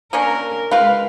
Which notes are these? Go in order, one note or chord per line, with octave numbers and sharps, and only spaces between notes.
A#3 C#4 D4 A#4
G#3 F4 B4 F5